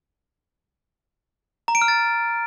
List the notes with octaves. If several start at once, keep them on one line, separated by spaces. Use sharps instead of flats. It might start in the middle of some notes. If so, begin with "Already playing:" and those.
A#5
D7
F6
A6